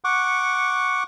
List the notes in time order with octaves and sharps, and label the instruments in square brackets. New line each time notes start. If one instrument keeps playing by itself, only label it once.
[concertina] F#5 C#6 D6